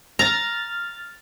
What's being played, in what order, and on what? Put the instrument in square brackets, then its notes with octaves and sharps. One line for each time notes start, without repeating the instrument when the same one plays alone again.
[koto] A#5 [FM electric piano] F6 A6